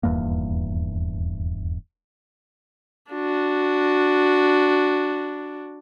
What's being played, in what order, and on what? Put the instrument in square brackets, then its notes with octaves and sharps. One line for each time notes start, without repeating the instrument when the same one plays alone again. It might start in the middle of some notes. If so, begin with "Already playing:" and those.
[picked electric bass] D#1 E2 G2 A#3
[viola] D4 F#4